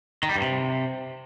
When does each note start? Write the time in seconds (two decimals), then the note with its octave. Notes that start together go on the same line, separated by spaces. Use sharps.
0.23 D#3
0.29 G3
0.36 G2
0.42 C3